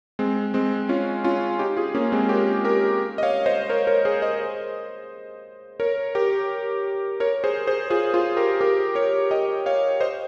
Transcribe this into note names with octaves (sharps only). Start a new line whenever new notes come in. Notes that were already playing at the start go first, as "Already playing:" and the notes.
G#3 C4
G#3 C4
C#4 F4
C#4 F4
D#4 G4
F4 G#4
A#3 C#4
G#3 C4
G4 A#4
G4 A#4
D#5
C#5 F5
C5 D#5
A#4 C#5
A#4 C#5
G#4 C5
C5 D#5
A#4 C#5
G4 A#4
A#4 C#5
G#4 C5
G#4 C5
F4 G#4
F4 G#4
G4 A#4
G4 A#4
A#4 C#5
D#5 G5
C#5 F5
C5 D#5